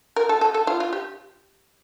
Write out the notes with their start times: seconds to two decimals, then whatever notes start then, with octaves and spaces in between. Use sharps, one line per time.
0.16 A#4
0.29 A4
0.41 A4
0.54 A4
0.67 F4
0.80 F4
0.93 G4